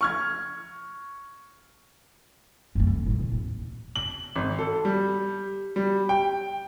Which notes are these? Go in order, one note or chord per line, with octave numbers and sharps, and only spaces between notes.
C#6 F6 G#6
F#2 A3
D3
A2 D#3
A#2
D#2
F#7
G#1
A4
G3
G3
G5